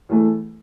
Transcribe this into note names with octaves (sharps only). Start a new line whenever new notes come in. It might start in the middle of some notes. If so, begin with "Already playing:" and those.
E2 E3 A3